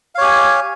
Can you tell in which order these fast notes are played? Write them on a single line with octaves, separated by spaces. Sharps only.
F5 C#5 G4 G#5